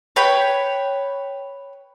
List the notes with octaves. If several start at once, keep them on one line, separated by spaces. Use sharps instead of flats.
B4 C#5 G5 B5